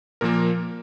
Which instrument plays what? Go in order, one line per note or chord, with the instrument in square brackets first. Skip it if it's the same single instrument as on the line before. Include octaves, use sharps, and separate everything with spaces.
[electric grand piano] A#2 F3 A#3 A#4